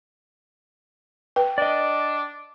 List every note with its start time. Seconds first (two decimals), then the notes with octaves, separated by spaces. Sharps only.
1.36 B4 G5
1.58 D4 D5 D#5